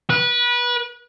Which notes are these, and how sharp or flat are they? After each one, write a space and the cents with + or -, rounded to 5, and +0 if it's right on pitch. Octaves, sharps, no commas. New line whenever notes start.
B4 -25